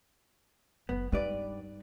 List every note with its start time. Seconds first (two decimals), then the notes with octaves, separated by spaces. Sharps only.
0.89 F#1 B3
1.12 G2 G3 D#4 B4 D5